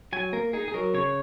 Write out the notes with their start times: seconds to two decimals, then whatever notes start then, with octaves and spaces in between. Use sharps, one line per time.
0.13 F#3 G#5
0.33 A#3 A#4
0.53 D#4 G#4
0.68 G#4
0.74 F#3 A#4
0.94 C#3 C#5